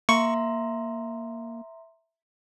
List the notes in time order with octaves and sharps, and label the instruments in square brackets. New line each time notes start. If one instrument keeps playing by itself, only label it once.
[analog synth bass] A#3 [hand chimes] E5 A#5 C6 [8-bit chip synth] C#6